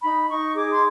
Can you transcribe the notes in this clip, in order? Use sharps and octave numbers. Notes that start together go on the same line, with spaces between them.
D#4 B5
D#4 C#6
G#4 D6
C6